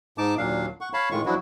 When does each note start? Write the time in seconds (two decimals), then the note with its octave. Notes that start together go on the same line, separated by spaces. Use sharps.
0.18 G#2 D#4 A5 D6
0.38 D#2 A#2 F#3 D4 F5
0.81 F#5 C#6
0.93 C#5 F5 A5 B5
1.11 A2 D#3 G#3 F4 C#6
1.26 F3 F#3 D4 E4 F#4